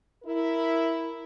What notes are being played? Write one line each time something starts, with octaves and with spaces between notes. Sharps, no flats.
E4 A#4